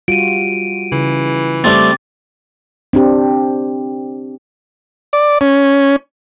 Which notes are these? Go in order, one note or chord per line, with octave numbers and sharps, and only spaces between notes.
G3 F4 F#4 D7 D#7
C#3 E3
G3 A3 C4 D6 A6
C4 D4 G4
D5
C#4